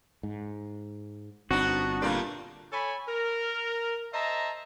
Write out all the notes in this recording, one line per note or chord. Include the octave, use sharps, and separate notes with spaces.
G#2
G1 B3 C4 D4 D#4 F#4
G2 A#2 A3 A#3 D5
A4 C#5 G#5 B5
A#4
C5 D#5 E5 A5 A#5